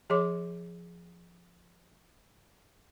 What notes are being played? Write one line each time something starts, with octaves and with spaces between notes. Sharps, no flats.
F3 G#4 C#5 C6 D6